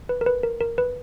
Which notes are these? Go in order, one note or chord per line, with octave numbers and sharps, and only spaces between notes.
B4
A#4
B4
A#4
A#4
B4